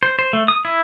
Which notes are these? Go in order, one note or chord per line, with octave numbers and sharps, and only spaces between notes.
C5
C5
A3
D#6
E4